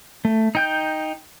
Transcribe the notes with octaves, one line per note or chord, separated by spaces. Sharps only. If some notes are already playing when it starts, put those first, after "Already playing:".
A3
D#4 G5 G6